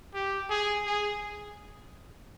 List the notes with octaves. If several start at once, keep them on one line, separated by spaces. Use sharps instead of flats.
G4
G#4
G#4